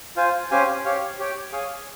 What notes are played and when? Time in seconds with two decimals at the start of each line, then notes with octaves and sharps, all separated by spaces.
0.16 F4 C5 F5 G#5
0.50 C#4 G4 C5 F5 G#5
0.85 G4 C#5 F5
1.19 G4 C#5 G5
1.52 G#4 C#5 F5 G#5